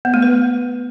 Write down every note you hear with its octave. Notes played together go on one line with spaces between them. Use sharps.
B3
A3
B4